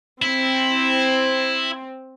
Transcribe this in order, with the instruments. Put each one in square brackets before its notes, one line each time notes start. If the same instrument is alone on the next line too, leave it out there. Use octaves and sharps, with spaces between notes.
[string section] C4 [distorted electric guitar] E4